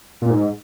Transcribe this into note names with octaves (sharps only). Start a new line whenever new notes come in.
A#2
G#2